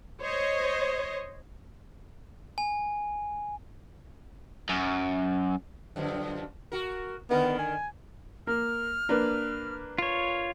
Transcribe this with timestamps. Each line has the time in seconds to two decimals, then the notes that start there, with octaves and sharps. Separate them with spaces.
0.21 C5 C#5 D#5
2.58 G#5
4.69 F#2
5.96 F#2 D3 F3
6.72 F#4 A#4
7.30 D3 D#3 B3 A#4
7.59 G#5
8.47 A#3 F6
9.09 A#3 D4 B4
9.98 F4 C#5